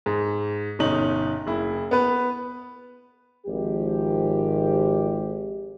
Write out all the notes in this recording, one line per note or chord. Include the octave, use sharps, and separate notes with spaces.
G#2
G1 B2 C#4 D#4 F#7
F#1 E4
B3 B4
G#1 F3 G4